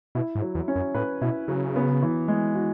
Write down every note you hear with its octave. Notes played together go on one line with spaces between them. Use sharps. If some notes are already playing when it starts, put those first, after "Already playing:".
B2 E4
G#2
F#3
E2
C#4
F#2
A2 B4
B2 E4
C#3 F#3
B3
E3
G#3
F#4